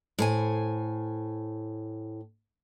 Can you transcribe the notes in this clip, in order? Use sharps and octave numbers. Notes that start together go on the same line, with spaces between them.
A2 C5 G#5